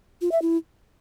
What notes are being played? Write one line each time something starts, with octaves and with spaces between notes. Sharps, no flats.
F4
E5
E4